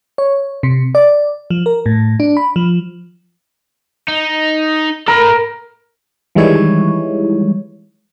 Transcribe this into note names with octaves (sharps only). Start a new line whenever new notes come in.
C#5
C3
D5
F3
A#4
A2
D4
B5
F3
D#4
A4 A#4 B5
D#3 E3 G3 G#3 E4 C#5